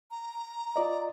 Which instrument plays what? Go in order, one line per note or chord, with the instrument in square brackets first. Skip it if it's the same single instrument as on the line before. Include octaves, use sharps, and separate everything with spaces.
[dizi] A#5
[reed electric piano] F4 D5 D#5